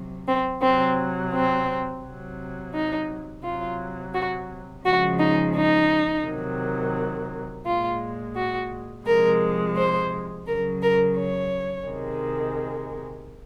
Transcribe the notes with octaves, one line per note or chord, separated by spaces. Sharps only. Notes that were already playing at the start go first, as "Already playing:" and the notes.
Already playing: C3 F#3
C4
C3 F#3 C4
C4
C3 F#3
D#4
C3 F#3 F4
F#4
C#3 F3 G#3 F#4
D#4
D#4
C3 D#3 F#3
A#2 G#3 F4
F#4
C3 F3 G#3 A#4
C5
C#3 F#3 A#4
A#4
C#5
C3 D#3 G#3